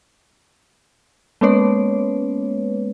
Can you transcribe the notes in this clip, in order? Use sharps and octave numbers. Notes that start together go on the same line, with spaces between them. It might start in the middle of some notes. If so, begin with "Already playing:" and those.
G#3 A#3 B3 C#4 B4 C#5